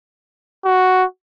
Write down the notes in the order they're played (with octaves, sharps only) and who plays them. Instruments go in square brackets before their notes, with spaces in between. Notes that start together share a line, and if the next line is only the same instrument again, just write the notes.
[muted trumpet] F#4